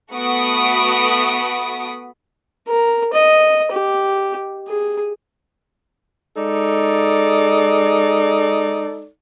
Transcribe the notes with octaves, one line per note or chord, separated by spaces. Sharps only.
A3 B3 F#4 B5 D#6 D7
A#4
D#5
G4
G#4
G#3 D#4 A4 D5